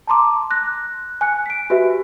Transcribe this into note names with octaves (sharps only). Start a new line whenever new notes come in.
A5 A#5 C6 D6
F#6 A#6
G#5 F#6 C#7
B6 D7
F#4 G4 B4 E5